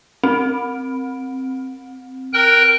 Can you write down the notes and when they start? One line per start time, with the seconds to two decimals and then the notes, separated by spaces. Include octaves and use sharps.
0.24 C4
2.33 A#4 G5 F#6